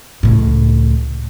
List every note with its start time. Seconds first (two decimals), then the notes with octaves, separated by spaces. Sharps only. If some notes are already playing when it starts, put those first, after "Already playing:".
0.23 C#2 A2